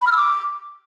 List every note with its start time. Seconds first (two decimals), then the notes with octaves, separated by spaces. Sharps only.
0.02 B5
0.07 F6
0.12 E6
0.17 D6